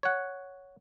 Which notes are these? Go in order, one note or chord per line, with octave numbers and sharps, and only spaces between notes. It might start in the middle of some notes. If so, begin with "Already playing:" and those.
C#5 F#5